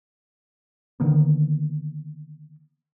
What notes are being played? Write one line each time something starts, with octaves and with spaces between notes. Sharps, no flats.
D3 D#3 A#3 B3